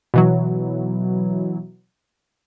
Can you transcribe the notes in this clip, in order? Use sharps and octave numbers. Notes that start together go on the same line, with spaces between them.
B2 E3 F#3